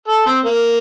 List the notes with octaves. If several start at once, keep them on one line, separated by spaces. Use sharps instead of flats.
A4
C4
A#3